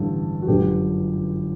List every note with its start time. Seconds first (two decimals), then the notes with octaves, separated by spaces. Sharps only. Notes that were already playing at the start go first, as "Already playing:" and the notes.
Already playing: A1 G2 D3 A4
0.42 F#4
0.47 G1 F#2 D3 G4